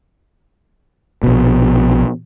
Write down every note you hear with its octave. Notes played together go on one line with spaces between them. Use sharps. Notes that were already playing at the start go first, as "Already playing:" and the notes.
A#1 B2